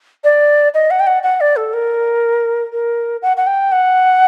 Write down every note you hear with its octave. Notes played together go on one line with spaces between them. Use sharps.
D5
D#5
F#5
G5
F#5
F#5
D5
A4
A#4
A#4
F#5
F#5
G5
F#5